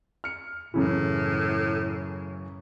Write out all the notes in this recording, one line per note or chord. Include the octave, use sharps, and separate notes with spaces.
F6 C#7
F#2 A2 C#3 E3